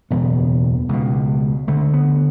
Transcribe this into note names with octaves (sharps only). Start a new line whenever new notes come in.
F#1 E2 B2 B3
C#2 B2
D2 D3 A3
B3